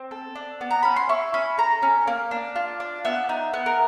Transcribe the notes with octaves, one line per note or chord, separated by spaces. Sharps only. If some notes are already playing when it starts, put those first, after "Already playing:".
Already playing: C4
A4
D4
B3
A#5
C#4 B5
C6
E4 C#6
C#4 B5
A4 A#5
C#4
A#3
D4
F4
D4
B3 E5
D#4
B3
A#4